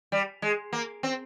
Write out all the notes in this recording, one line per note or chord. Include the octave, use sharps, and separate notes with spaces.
G3
G#3
A#3
C4